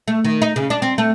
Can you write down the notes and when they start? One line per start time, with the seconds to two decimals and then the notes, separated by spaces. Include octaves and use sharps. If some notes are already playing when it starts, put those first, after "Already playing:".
0.08 A3
0.24 D#3
0.42 D#4
0.56 C#3
0.70 D4
0.82 C4
0.98 A3